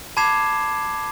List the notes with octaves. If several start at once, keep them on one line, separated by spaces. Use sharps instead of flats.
A5 B5 D6 G#6 C7 E7